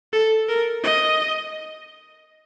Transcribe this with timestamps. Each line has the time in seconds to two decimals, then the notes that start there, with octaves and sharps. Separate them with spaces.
0.13 A4
0.49 A#4
0.84 D#5